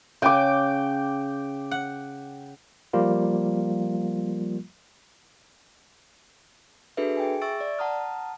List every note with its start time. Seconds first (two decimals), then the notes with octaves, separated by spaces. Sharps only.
0.22 C#3 G5 D6
1.71 F#5
2.93 F3 G3 A#3 F4
6.97 D4 F#4 G#4 A4 B4 E5
7.17 G#4 G5 G#5
7.42 E5 C#6 E6 A6 D7
7.61 D5
7.79 F#5 A5 A#5 D#6 F6